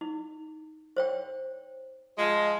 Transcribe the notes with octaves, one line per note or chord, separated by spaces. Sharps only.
D#4
C5 C#5 G5
F3 G#3